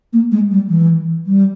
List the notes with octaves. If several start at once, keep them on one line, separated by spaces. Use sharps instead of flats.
A#3
G#3
G3
E3
G3